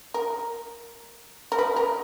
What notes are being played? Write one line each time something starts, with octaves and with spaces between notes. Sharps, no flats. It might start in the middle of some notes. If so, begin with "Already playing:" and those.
A#4
A#4
B4
A#4